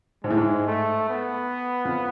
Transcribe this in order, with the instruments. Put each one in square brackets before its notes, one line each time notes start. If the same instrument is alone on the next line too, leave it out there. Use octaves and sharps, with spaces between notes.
[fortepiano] G#2 [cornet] G#3
[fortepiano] A2
G#2
[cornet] A3
B3
[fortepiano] F2